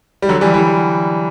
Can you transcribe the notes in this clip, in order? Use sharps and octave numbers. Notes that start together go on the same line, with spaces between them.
G3
D3 F#3
E3 G3
E3 G3